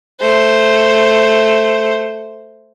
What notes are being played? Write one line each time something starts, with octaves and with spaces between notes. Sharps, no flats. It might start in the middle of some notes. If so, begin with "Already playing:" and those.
A3 C5